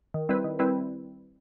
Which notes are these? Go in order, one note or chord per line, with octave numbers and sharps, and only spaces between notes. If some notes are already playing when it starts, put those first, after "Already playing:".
D#3
G3 C4 E4 B4
D#3
G3 C4 E4 B4